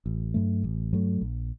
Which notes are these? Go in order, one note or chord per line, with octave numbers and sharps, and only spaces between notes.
A1
G2 F#3 A3
A1
G2 F#3 A3
A#1